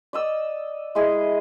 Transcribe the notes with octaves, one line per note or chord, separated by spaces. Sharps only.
D5 D#5 E6
G#3 E4 G#4 D#5